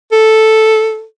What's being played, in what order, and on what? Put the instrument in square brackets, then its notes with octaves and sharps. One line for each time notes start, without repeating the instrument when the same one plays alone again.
[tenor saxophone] A4